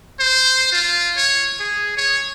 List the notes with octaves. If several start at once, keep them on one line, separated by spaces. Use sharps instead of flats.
C5
F4
C#5
G#4
C#5